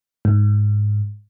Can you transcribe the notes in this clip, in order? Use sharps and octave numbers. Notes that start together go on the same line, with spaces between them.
G#2